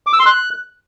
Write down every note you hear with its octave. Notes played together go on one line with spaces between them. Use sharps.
D6
E6
C6
F#6